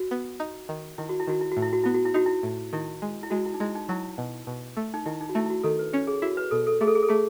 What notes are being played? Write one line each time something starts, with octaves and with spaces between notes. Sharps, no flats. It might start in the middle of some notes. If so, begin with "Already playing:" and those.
Already playing: F#4
B3
D#4
D#3
D#3 E4
F#4
E4
D#3 F#4
E4
F#4
A2
E4
F#4
B3 E4
F#4
E4
D#4 F#4
E4
A2
D#3 E4
G#3
E4
G#3 F#4
E4
D#4
G#3 E4
D#4
F#3 E4
B2
B2
A3
D#4
D#3 E4
D#4
F#4
A3 E4
E4
F#4
D#3 A4
B4
C#4 C#5
G#4
E4 F#4
B4
B2 A4
A4
A3 G#4
A4
G#4
A4
A3 G#4